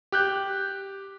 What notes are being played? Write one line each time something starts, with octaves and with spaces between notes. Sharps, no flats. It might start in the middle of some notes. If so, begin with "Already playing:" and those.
G4 F#6 G6